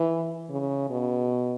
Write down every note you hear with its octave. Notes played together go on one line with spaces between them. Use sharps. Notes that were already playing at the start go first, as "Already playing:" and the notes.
Already playing: E3
C#3
B2